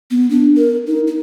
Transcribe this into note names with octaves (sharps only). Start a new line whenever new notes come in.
B3
D4
A#4
D#4
D#4